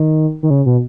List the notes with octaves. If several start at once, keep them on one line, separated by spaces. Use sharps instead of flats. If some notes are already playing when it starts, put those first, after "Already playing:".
Already playing: D#3
D#3
C#3
B2